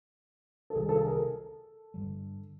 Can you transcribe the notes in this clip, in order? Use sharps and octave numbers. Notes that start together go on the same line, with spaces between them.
A4
C2 C3 D#3 G3 G#4
A4
G#4
A#4
A4
G2 D3 G3